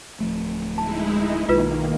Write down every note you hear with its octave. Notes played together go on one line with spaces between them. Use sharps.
D1 F3 A3
G#3 D#4 E4 A5
B1 D#3 A#3 F4 B4